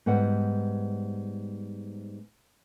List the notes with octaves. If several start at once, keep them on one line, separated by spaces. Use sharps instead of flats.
G#2 G3 B3 F#5